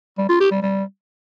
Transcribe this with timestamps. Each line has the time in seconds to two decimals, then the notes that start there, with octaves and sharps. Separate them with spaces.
0.18 G3
0.29 F4
0.40 G4
0.51 G3
0.62 G3